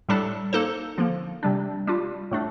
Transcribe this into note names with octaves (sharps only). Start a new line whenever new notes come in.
A2 G3 D4 A4
A#3 D#4 A4 C5
D3 F3 A#3
C3 G3 D4
G3 D4 F4
A2 A3 D4